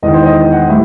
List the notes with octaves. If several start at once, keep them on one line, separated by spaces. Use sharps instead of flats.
E1 E2 D#3 D#5
C5
D#5
F#5
A2 G3 E5